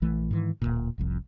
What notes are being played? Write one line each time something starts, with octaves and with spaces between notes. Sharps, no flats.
A#1 E3 A3
G#2 D#3 E3
D1 G#1 A#2
F1 C2 F2